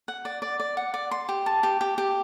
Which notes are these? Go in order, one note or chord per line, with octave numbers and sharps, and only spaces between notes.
F#5
D5
D5
D5
F#5
D5
C6
G4
A5
G4
G4
G4